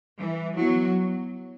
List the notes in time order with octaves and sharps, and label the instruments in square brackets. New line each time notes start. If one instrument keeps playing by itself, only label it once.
[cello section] E3 [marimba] G3
[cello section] F#3 [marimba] B3 E4